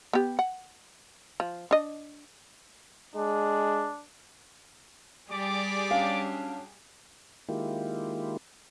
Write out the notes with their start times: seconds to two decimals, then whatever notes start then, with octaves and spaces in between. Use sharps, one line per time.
0.13 B3 G4
0.39 F#5
1.40 F3
1.71 D4 D#5
3.16 G#3 D4
5.30 G3 G4 G#4 D5 D6
5.91 F#3 C#4 D4 F5
7.49 D#3 G#3 A#3 E4 F4 G4